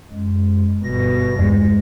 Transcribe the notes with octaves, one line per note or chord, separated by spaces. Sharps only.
F#2 G#3
G1 B2 A#6
E2 G2 G#3